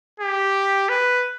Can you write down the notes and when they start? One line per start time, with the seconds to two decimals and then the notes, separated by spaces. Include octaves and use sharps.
0.20 G4
0.89 B4